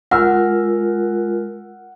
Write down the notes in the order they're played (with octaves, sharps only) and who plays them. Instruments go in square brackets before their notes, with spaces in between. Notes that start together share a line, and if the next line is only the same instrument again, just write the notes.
[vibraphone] G#3 F4 A#4 [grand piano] F#5 E6 F6